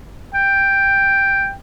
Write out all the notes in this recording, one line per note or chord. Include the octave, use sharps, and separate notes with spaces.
G5